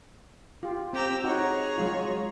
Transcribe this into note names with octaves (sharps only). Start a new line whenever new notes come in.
F4 G4
C4 G4 A#5 E6
D#4 F#4 G#4 C#5 A#5
F#3 G#3 F4